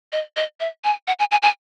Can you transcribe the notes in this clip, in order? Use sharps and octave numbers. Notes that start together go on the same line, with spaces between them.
D#5
D#5
E5
G#5
F#5
G#5
G#5
G#5